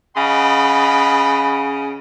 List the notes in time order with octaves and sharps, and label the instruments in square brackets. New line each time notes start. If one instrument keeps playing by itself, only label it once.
[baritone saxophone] C#3 [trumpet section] D#5 F#5 B5